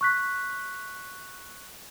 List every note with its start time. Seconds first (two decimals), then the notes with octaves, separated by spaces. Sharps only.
0.01 C#6 F#6 B6